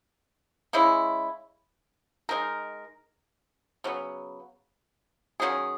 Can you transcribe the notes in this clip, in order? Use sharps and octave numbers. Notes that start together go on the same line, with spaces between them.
C#3 G#3 C#4 E4
G#3 D#4 A#4
C#3 F#3 B3
D#3 F#3 C#4 G#4